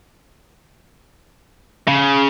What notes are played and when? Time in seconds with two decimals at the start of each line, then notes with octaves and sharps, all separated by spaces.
1.88 C#3